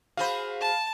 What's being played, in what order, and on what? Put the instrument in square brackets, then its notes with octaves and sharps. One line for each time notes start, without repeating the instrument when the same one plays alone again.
[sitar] F#4 G#4 C5 [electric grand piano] F5 B5
[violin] A5